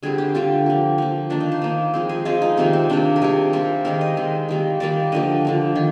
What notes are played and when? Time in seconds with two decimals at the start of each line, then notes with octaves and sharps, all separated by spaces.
0.03 D3 G3 C4 G#4
0.18 G4
0.35 D3 G3 C4 F4
0.66 F3 A#3
0.98 F3 A#3
1.30 D#3 A#3 D4
1.40 D#4
1.52 C5
1.62 D#3 A#3
1.94 F3 G#3 C4
2.09 G#4
2.25 F3 G#3 C4 F4
2.42 D#4
2.57 C3 D#3 A#3 C4
2.73 C4
2.90 C3 D#3 A#3 D4
3.16 A#4
3.22 C3 G3 A#3 G#4
3.53 C3 G3 A#3 C5
3.85 D#3 G#3 C4 A#4
4.01 D#5
4.17 D#3 G#3 C4
4.49 D#3 G3 A#3
4.80 D#3 G3 A#3 D5
5.12 D3 F3 A#3 D#5
5.45 D3 F3 A#3
5.76 D#3